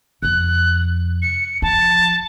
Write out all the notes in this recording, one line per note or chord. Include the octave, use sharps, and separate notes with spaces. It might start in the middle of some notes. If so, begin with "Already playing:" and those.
F2 C3 F#6
C#7
F3 A5